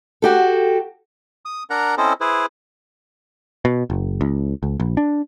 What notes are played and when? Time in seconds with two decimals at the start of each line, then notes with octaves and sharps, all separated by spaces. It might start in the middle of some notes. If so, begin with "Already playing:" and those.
0.22 F#4 G4 A4
1.45 D#6
1.70 D4 A#4 F#5 A#5
1.98 C4 C#4 E4 A4 C5 D#5
2.21 E4 G#4 B4 C5
3.65 B2
3.90 F#1
4.21 C#2
4.63 C#2
4.80 A#1
4.97 D4